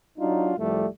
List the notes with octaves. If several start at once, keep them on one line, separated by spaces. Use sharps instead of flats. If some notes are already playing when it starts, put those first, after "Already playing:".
F#3 D4 D#4 F4
C2 F2 G3 A3